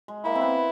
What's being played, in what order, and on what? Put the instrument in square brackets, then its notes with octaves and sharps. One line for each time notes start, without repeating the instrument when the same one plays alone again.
[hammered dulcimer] G#3
[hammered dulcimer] A#3 [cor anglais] E4
[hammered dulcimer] C4
B3